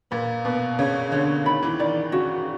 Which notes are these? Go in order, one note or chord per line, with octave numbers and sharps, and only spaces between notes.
A#2 B4
B2 B4
C#3 C#5
D3 C#5
D#3 B5
E3
D#3 D5
C#3 F#4